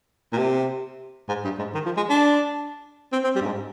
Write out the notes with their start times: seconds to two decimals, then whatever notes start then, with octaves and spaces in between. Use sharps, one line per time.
0.32 A#2
0.38 C3
1.28 G#2
1.44 G2
1.59 G#2
1.74 D#3
1.85 F3
1.97 G#3
2.09 D4
3.12 C4
3.24 C4
3.35 G3
3.41 G2
3.46 G#2